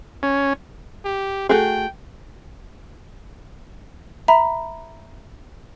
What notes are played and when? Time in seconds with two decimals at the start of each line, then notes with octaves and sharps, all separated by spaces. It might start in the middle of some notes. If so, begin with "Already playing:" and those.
0.23 C#4
1.05 G4
1.49 A3 F#4 G#4 G5
4.28 E5 A#5 B5